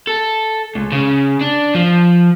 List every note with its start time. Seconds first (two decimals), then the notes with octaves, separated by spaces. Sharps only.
0.08 A4
0.76 C#2
0.92 C#3
1.41 D4
1.75 F3